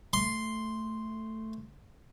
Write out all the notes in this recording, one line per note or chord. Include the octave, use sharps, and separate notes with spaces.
A3 C6